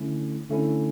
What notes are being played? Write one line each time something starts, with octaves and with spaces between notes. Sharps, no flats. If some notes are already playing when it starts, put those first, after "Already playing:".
Already playing: D3 A3 C#4 E4
D3 A3 C#4 E4